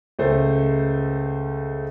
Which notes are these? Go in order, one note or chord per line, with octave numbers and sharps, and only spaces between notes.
C#2 A3 C5